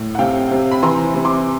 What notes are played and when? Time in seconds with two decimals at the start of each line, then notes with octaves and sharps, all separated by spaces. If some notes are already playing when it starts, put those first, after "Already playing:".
Already playing: A2
0.15 F#5
0.19 C3 F5 G5
0.51 C3
0.71 B5
0.83 E3 A#5 C6
1.14 C3
1.25 C6 D6